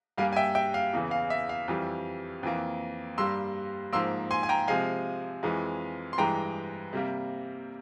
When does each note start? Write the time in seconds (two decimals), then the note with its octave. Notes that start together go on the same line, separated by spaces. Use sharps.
0.18 G2 G3 A#3 F5 G#5
0.33 G#5
0.36 E5 G5
0.55 E5 G5
0.74 F5
0.93 E2 C#3 E3
1.11 F5
1.30 E5
1.49 F5
1.68 F2 E3 G3
2.43 F2 E3 A#3
3.18 G2 G3 A#3 C6 E6
3.93 G#2 F3 A#3 C6 E6
4.31 G#5 C6
4.43 G#5
4.49 G5 A#5
4.68 C3 F3 G#3 F5 G#5
5.43 F2 E3 G#3
6.13 C6
6.18 G2 E3 G#3 G5 A#5
6.93 C3 G3 A#3